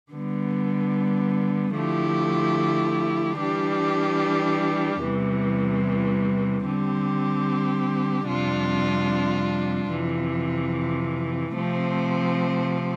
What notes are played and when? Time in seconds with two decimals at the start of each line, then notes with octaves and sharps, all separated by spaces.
0.11 D3 G3 B3
1.74 D3 F3 A3 E4 G4
3.38 E3 G3 D4 G4
5.01 E2 C3 E3 G3
6.65 D3 G3 C4 G4
8.27 F2 C3 G3 D4 F4
9.90 F2 C3 E3
11.54 C3 F3 A3 C4